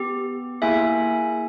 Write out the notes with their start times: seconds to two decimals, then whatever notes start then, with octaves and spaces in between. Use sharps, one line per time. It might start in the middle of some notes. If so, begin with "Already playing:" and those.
Already playing: B3 G4
0.62 A#3 E4 G#4 E5 G#5